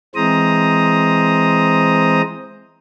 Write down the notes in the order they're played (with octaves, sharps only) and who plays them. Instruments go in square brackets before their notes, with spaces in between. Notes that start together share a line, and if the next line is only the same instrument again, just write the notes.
[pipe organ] E3 G#3 C4 C5 A#5 D#6